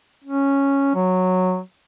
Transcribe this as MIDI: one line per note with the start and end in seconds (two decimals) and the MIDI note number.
0.24 0.93 61
0.95 1.59 54